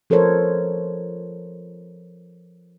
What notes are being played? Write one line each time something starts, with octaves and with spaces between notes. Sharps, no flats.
F3 A4 A#4 C5 C#5